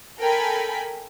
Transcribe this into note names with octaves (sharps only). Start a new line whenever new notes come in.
A4 A#4 G5 G#5 B5